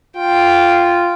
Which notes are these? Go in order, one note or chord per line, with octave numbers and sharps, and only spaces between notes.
F4 G5